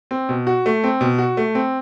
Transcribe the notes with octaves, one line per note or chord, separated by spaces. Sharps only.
C4
B2
F#4
A3
C4
B2
F#4
A3
C4